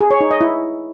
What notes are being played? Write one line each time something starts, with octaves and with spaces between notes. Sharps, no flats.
G#4
C#5
D#4
D#5
E4